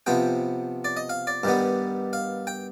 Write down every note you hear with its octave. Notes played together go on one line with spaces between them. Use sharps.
C3 F3 B3 G5
D5
D#5
F5
D5
G2 D#3 G3 B3
F5
G5